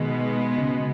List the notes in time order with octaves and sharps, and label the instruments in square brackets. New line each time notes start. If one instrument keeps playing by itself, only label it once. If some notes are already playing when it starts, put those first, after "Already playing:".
Already playing: [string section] B2 G#3 B3 [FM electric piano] D#3
[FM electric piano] C#3